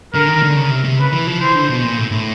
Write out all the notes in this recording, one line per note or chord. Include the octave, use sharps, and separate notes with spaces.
D3 A#4
D#3
D3
C#3
C3
C3
C#3 B4
E3
F3
E3 C5
D3
B2
A#2
A2
A2